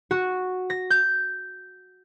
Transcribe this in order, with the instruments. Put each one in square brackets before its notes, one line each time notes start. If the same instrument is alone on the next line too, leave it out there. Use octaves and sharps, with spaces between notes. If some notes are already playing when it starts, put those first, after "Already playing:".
[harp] F#4
A#6
G6